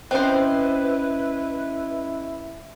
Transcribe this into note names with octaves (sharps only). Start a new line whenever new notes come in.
C4 C#4 E4 B4 C5 D#5 F#6